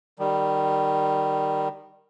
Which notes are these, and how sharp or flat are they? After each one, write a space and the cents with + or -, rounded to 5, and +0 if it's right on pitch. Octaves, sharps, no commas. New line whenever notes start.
D#3 -15 G3 +0